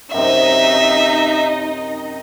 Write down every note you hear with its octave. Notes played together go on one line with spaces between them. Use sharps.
F#2 C3 D#4 D#5 E5